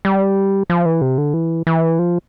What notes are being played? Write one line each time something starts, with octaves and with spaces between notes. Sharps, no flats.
G3
F3
E3
C3
D3
E3
E3
F3